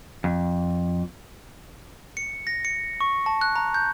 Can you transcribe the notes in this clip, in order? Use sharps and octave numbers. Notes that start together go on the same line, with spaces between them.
F2
C#7
A#6
C#7
C#6
A5
F#6
A#5
G6